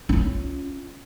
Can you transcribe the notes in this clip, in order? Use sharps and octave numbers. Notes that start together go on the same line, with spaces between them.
C#4 F4